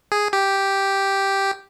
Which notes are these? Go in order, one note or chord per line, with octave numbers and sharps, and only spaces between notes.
G#4
G4